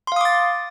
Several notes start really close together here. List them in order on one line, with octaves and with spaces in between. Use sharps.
C6 F5 D#6 D6 A6